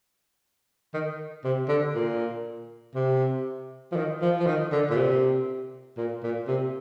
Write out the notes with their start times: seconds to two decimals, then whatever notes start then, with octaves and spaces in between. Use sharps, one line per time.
0.94 D#3
1.44 C3
1.68 D3
1.95 A#2
2.95 C3
3.92 F3
3.96 D#3
4.22 F3
4.40 F3
4.46 D#3
4.72 D3
4.90 A#2
4.97 C3
5.98 A#2
6.24 A#2
6.48 C3